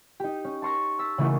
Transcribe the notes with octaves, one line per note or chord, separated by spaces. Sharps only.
D#4 G4
C#4
A5 C6 C#6 F6 A#6
E6 A6 B6
C#3 E3 A3 A#3 D#4 F#4